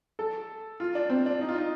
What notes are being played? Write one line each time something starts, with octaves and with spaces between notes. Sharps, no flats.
A4
F4
D4
C4
D4
D#4
F4
D#4